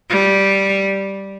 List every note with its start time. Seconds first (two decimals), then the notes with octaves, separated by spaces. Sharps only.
0.09 G3